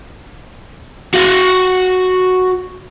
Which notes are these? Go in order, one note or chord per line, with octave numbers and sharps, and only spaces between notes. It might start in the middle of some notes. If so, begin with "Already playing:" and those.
F#4 F5